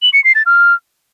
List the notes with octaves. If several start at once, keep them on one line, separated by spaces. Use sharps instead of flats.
F#7
C#7
C7
A6
F6